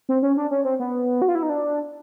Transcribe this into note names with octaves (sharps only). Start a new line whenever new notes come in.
C4
C#4
D4
C#4
C4
B3
F#4
F4
E4
D#4
D4